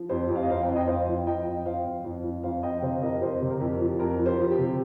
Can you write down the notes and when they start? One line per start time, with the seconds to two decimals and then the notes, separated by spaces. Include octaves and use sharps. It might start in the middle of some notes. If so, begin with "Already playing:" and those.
Already playing: F3
0.09 F2 G4 C5
0.29 F2
0.36 F5
0.43 D#5
0.49 F2 C5 F5
0.62 G5
0.69 F2
0.76 D#5 G5
0.87 F2 C5 F5
1.08 F3
1.27 F3 D#5 G5
1.46 F2
1.66 F3 C5 F5
1.85 F2
2.04 F2
2.24 F3
2.43 F2 C5 F5
2.63 F2 D#5 G5
2.82 C3 C5 F5
3.02 F2 A#4 D#5
3.21 F2 G4 C5
3.41 C3
3.50 A#4
3.60 F2 G4
3.80 F3
3.99 F2 A#4
4.18 F3
4.26 G4 C5
4.38 F3
4.51 G4
4.58 C3